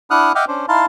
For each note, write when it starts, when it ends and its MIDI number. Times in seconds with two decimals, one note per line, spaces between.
0.11 0.32 62
0.11 0.32 64
0.11 0.32 78
0.11 0.32 87
0.11 0.32 89
0.11 0.32 90
0.35 0.45 75
0.35 0.45 76
0.35 0.45 78
0.35 0.45 79
0.35 0.45 86
0.35 0.45 89
0.48 0.66 61
0.48 0.66 62
0.48 0.66 72
0.68 0.86 63
0.68 0.86 64
0.68 0.86 77
0.68 0.86 81
0.68 0.86 84